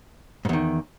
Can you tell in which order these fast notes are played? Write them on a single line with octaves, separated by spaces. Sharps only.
G#2 E2 D#3